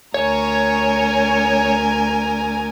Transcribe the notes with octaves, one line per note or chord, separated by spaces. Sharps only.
D2 A#4 C#5 G#5